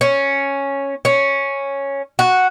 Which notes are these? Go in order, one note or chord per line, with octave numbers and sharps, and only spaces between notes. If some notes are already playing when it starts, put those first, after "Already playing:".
C#4
C#4
F#4